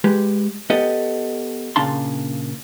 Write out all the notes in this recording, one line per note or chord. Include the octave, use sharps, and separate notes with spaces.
G#3 G4 B4
B3 G4 A4 D#5
A#2 C#3 D4 F5 A5 C6